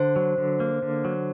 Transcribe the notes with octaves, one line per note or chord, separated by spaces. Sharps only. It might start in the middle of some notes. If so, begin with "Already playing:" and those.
Already playing: D3 C5
F#3
D3
A#3
D3
F#3